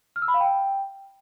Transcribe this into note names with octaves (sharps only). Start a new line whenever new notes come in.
F6
E6
B5
F5
G5